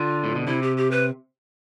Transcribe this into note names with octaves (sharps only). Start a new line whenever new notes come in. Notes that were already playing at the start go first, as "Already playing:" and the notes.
Already playing: D3 F4
A2
B2
C3 E4
G4
G4
B4